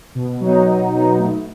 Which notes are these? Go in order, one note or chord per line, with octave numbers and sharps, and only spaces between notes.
B2
F#3 B3 D#4
B2
F#3 B3 D#4
A3